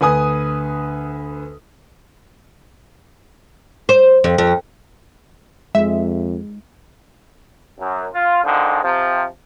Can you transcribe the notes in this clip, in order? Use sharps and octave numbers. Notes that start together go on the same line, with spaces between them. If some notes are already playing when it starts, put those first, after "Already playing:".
D2 B4 G#5 D#6
C5
F2
F2
F2 G#3 E5
F#2
F4
D3 D#3 F3 G#3
C3 F3